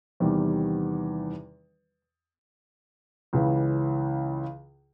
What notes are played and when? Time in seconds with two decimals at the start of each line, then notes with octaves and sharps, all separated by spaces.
0.20 E2 C3 D#3 G3
3.33 C#2 C#3 E3